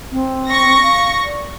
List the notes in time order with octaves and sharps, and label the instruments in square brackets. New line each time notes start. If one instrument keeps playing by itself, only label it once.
[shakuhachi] C4
[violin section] C#6 A#6
[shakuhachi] F5
D5